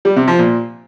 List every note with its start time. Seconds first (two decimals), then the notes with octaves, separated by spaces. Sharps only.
0.05 G3
0.16 C3
0.28 F3
0.39 A#2